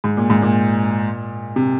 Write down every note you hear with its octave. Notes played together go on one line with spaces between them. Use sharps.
G#2
A#2
G#2
A#2
C3